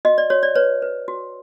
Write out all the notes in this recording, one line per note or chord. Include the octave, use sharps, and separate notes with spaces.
F#4 D#5
D5
F#4 C#5
D5
B4 C#5
B4
F#4